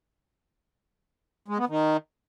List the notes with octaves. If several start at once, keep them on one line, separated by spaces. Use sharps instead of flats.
G#3
B3
D#3